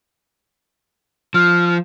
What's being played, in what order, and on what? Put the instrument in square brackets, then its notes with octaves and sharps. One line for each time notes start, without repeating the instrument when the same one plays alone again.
[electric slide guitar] F3 [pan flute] F6